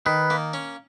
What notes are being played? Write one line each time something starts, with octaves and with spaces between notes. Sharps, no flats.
D#3 B4
A#3
C#4